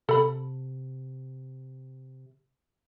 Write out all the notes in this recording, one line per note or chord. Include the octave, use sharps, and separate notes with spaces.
C3 A4 B5